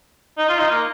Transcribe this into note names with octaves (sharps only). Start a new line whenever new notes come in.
D#4
F4
D#4
A#3